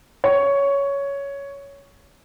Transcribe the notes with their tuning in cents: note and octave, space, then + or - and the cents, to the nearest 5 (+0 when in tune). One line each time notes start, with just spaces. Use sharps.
C#5 +10